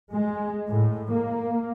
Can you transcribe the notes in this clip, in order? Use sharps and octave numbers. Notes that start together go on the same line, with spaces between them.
G#3
A2
A#3